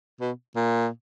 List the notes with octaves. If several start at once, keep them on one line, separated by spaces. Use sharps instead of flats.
B2
A#2